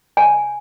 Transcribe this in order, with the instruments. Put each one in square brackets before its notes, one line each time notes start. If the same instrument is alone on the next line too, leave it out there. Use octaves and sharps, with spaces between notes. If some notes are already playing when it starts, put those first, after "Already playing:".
[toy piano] G#5